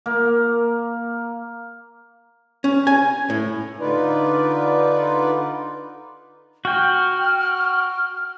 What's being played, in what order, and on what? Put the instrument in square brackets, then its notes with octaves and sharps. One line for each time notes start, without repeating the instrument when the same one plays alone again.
[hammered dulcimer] A#3
[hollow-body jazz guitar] C#4
G#5
A2
[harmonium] D3 D#4 F4 B4 D5
[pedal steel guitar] F#4 G5 [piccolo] F6